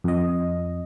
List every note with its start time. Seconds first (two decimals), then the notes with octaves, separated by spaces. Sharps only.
0.04 F2 D#5